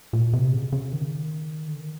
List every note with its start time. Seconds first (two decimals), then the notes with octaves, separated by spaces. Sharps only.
0.13 A#2
0.33 C3
0.53 C#3
0.72 C#3
0.93 D#3
1.68 D3
1.80 D#3